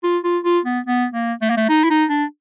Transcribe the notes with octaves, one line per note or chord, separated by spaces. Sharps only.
F4
F4
F4
B3
B3
A#3
A3
A#3
A3
D#4
E4
D#4
D4